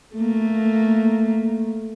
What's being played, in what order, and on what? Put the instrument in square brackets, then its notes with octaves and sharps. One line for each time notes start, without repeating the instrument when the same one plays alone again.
[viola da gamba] A3 A#3